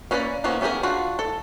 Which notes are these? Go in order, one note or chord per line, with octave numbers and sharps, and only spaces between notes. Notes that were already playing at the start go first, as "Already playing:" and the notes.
A#3 C#4 B4 C#5 D5
F3 A#3 B3 C#4
B3 C#4 G4 G#4 A#4
D4 F4 F#4 F#5
A4